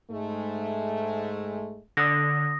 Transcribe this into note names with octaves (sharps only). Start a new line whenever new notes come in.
G#2 G#3 A3
D3 D#6 A#6